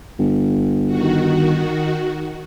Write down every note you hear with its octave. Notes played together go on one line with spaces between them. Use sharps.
G1
D#3 F#4